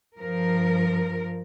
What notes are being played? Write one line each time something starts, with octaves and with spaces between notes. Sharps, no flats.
G2 F3 A#4